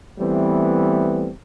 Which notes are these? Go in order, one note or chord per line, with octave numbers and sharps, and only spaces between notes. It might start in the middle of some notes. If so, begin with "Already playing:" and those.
E3 G3 A3 B3 C4